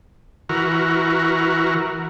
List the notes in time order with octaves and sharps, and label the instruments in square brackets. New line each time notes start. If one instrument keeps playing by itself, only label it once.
[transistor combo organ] E3 F#4 A#4